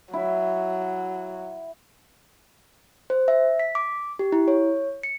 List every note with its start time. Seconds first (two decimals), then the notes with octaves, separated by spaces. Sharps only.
0.13 F#3 E4
3.10 C5
3.28 E5
3.59 B6
3.75 D6
4.19 G4
4.32 E4
4.48 C#5
5.03 C#7